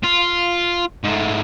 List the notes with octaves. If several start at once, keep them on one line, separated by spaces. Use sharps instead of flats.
F4
G#2 A3